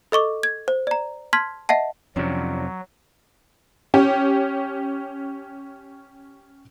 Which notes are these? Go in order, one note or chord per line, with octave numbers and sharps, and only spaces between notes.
A4 D#5 C#6 D6
G#6
C5
D5 A#5
A5 C6 F6 G#6 B6
D#5 E5 F#5 A5
F2 C3 F3 F#3 C#4 D4
C#4 G4